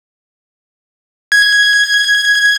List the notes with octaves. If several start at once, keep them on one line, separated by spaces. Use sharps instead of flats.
G#6